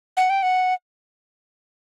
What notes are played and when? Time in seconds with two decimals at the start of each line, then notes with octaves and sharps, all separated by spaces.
0.17 F#5
0.30 G5
0.43 F#5